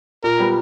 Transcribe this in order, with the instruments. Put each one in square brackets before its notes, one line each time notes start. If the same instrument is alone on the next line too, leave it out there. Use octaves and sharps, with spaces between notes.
[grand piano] A#2 [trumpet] A#4
[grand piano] G3 B3